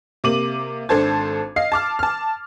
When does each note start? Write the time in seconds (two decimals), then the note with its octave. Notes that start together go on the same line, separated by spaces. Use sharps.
0.24 C3 A#3 D6 D#7 F#7
0.89 G#1 D4 A4 C5 A5 G#6
1.56 D#5 F5 C7
1.72 A5 D6 F6
1.99 A5 F6